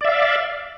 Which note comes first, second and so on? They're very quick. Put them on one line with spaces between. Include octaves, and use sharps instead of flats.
D5 E5 F5